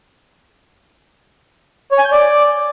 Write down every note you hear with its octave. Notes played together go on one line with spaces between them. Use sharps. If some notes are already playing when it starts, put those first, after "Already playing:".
C#5
G#5
G6
D5